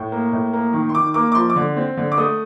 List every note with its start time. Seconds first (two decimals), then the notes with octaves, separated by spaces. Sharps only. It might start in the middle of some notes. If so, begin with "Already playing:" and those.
Already playing: A2
0.12 A#3
0.33 A2
0.53 A#3
0.73 D#3
0.89 C6
0.94 D#3 D6
1.14 A#3 D6
1.32 D6
1.35 F3 C6
1.50 D6
1.56 D3
1.77 C4
1.97 D3
2.12 D6
2.18 A3 D#6